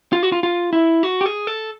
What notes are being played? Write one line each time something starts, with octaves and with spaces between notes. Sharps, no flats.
F4
F#4
F4
F4
E4
F#4
G4
G#4
A4